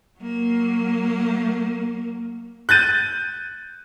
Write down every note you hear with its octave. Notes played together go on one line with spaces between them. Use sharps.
F#3 A#3
F#6 G6 A6 D#7